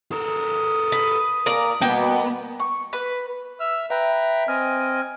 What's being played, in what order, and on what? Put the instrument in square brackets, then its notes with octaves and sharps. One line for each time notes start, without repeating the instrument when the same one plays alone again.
[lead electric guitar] A4 A#4 [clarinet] D#6
[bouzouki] B4
[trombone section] A#2 [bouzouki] A#4 D5
[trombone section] B2 [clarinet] G3 [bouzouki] A#3 G5 [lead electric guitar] B3
[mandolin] C#6
B4
[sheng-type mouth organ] E5 E6 F6
[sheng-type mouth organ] B4 G5 A#5 [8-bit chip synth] E5
[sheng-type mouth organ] C4 D#5 G#5 [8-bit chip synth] F6